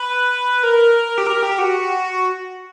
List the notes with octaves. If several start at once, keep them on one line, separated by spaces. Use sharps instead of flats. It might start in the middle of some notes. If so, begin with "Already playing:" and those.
Already playing: B4
A#4
G4
A#4
G4
F#4